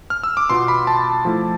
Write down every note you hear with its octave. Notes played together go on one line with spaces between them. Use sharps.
F6
E6
D6
B2 B3 F4 C6
B5
A5
F3 A3 E4